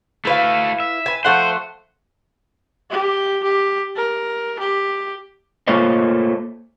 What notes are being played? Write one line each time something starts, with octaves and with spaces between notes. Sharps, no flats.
A3 E4 F#4 B4 F5
E5
B4 G#5
F3 A3 C5 F#5
G4
G4
A#4
G4
A3 A#3 F4 C5 C#5 D#5